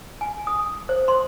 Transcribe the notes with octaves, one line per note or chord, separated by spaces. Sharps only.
G#5
D#6
C5
C6